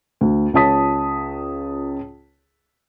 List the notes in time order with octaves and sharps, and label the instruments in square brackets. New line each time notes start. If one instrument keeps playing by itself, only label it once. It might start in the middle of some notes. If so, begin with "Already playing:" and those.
[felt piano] D2
C#2 F4 C#5 A5 D#6 B6